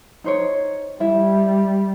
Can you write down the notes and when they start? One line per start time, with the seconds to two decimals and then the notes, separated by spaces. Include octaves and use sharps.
0.24 D#4 C5 C#5
1.00 G3 E4 E5